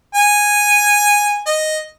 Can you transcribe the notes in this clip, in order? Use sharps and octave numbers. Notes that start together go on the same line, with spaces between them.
G#5
D#5